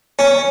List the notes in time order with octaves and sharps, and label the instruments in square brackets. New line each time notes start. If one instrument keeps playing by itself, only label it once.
[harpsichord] C#4